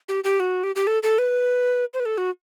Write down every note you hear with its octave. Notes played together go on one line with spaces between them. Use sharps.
G4
G4
F#4
G4
G4
A4
A4
B4
C5
B4
A4
F#4